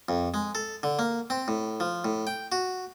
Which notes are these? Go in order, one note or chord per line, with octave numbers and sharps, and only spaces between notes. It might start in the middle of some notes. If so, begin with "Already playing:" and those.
F2
G#3
A4
D3
A#3
C4
A2
F3
A2
G5
F#4